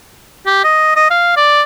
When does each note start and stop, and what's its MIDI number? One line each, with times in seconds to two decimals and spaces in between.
0.46 0.62 67
0.64 0.93 75
0.96 1.06 75
1.10 1.34 77
1.37 1.62 74